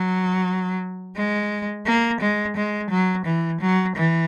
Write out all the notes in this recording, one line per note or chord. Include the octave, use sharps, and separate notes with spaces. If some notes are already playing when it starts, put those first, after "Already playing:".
Already playing: F#3
G#3
A#3
G#3
G#3
F#3
E3
F#3
E3